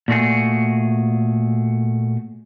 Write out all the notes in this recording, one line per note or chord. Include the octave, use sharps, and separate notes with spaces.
A#2 A3 F#4 G#4